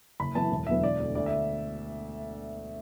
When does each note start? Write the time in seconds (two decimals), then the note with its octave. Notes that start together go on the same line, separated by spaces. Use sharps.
0.19 F#1 B5
0.35 F#2 E3 B3 A5
0.51 E1
0.67 E2 D3 F#3 B3 E5
0.83 E1 D5
1.00 D2 D3
1.15 D2 D5
1.26 E5